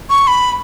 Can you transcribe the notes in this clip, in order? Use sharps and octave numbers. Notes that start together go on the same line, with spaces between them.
C#6
B5